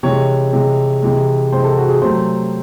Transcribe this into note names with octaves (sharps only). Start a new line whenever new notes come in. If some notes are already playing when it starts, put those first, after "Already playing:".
C3 E3 G#3 C#5
C3 E3 G#3
C3 E3 G#3
C3 E3 G#3 C5
A4
F#4
G#4
C3 F#3 A3 C5